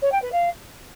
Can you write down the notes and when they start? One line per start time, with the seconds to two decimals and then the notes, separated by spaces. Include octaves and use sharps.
0.02 C#5
0.12 G5
0.22 B4
0.32 F5